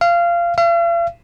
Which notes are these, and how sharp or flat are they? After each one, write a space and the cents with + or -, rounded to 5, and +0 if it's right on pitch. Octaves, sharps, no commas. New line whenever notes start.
F5 -20
F5 -45